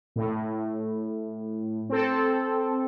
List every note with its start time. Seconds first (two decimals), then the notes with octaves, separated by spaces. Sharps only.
0.16 A2
1.89 C4 A4